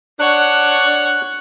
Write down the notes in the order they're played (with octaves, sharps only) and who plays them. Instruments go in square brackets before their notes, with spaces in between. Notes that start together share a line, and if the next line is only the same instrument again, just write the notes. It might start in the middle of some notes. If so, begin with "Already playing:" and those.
[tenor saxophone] D4 [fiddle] C#5 F#5 [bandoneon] F#6